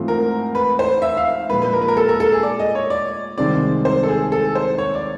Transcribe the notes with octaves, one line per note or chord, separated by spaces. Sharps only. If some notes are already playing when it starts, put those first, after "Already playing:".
Already playing: G#2 E3 A3 C4 F4
A#4
B4
C5
E5
F5
A#2 F3 G#3 B4
B4
A#4
B4
A#4
A4
A#4
A4
G#4
D5
D#5
C#5
D5
C2 C3 D#3 G#3 C4 D5
C5
A4
G#4
A4
C5
C#5
D5